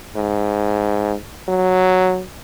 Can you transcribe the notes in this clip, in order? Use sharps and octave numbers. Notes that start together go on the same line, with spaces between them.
G#2
F#3